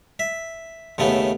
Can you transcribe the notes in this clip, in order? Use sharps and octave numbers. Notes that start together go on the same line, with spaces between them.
E5
D#2 C#3 A3 B3